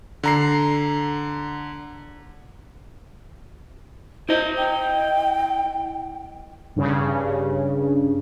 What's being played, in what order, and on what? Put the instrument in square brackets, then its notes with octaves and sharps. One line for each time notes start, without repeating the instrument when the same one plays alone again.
[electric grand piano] D3 A#5 C7
[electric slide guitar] E4 D#5 [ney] C5
[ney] G5
[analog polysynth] G2 C#3